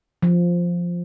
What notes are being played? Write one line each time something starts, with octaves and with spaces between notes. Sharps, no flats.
F3